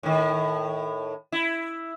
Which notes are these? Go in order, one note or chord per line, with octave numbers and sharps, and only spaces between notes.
A2 D#3
E4